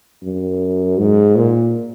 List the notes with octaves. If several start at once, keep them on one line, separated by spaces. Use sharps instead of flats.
F#2
G#2
A#2